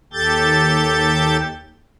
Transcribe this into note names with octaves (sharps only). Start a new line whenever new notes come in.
D#2 G4 A4 G6 A6